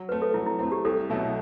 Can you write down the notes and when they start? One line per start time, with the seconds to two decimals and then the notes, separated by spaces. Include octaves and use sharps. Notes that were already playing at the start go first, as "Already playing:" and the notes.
Already playing: F#3
0.09 A3 C4 B4
0.22 A4
0.34 F#3 E4
0.46 E4
0.59 A3 C4 E4
0.72 G4
0.85 C2 A4
1.10 B2 F#3 A3 E4